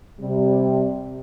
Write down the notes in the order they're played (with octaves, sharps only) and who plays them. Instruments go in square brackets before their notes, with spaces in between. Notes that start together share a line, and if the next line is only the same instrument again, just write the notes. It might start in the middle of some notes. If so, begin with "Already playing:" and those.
[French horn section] C3 G3